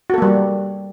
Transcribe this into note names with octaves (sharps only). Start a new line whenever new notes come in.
G3 A#3 F#4 A4